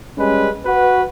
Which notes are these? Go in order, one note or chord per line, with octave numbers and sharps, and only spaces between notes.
G3 G#3 C#4 B4
F#4 B4